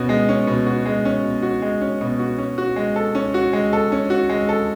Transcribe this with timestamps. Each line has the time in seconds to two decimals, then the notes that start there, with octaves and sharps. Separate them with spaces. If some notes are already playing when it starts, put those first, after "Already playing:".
Already playing: B2 C#4 F#4
0.09 G#3
0.29 C#4
0.47 B2
0.66 F#4
0.86 G#3
1.05 C#4
1.24 B2
1.42 F#4
1.62 G#3
1.81 C#4
2.01 B2
2.19 F#4
2.38 C#4
2.58 F#4
2.76 G#3
2.96 A4
3.15 C#4
3.34 F#4
3.53 G#3
3.73 A4
3.92 C#4
4.10 F#4
4.29 G#3
4.49 A4